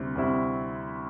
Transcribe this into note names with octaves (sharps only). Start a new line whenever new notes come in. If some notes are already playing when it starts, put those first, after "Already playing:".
Already playing: D2 C3 G3 C4 E4
D2 C3 G3 C4 E4